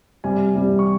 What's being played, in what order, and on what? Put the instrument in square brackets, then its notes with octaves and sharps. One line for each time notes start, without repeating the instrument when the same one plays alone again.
[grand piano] C3 G3 G#5
C3 G3
C#6